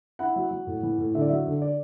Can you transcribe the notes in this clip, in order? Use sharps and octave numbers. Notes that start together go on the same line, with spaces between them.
E4 F#5
F#3
F#3
A2
E3
A2
D3 E5
D5
F#3 E5
D3
D5